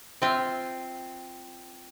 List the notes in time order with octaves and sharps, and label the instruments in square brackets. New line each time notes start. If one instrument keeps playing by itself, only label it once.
[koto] C4 F4 E5